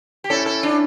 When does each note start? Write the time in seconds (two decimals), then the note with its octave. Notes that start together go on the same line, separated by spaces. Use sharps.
0.24 G4
0.30 C#4 E4 A4
0.46 A4
0.63 D4